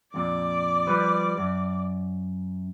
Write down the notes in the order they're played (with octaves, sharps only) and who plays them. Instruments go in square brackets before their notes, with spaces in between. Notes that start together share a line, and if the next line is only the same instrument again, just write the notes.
[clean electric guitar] F2 A#2 [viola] D5
[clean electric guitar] F3 G3 B4
F#2